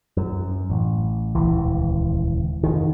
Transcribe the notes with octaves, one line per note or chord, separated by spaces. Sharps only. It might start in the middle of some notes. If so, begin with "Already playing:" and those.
F#2
A1
D#1 C#2 E3
F1 D#3